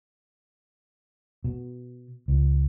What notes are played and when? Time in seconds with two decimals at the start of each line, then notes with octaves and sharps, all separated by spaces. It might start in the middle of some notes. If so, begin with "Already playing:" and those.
1.44 B2
2.28 C#2